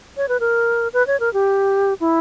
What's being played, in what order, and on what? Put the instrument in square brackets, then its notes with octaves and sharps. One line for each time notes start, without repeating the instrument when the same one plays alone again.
[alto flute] C#5
B4
A#4
B4
C#5
A#4
G4
E4